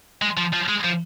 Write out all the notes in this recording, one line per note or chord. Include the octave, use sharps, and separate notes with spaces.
G#3
F3
F3
G#3
F3